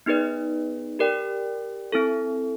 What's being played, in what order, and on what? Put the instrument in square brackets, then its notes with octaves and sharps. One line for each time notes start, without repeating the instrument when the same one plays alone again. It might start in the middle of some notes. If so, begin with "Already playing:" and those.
[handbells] B3 D#4 G#4 B4 D5
G4 A#4 D5 G5
C4 E4 A4